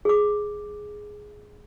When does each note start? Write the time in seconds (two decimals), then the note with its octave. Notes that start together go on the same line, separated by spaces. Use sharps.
0.05 G#4 D6